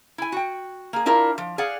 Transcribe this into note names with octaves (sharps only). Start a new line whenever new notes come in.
E4 G#5
F#4 G5
A#3 G#4
D4 E4 F4 A#4
F3
G#4 D5 F5 F#5